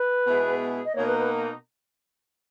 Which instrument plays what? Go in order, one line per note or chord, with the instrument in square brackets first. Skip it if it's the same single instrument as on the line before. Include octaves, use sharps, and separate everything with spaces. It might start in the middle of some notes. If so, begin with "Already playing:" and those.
Already playing: [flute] B4
[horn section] B2 G#3 B3 E4 G#4
[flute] D#5
[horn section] B2 A#3 D#4 [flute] C#5
[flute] B4
B4